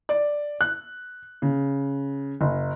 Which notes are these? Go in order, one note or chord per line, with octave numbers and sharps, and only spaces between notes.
D5
F#6
C#3
F#1